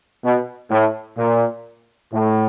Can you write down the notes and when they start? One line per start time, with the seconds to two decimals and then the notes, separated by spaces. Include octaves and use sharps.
0.24 B2
0.71 A2
1.18 A#2
2.13 A2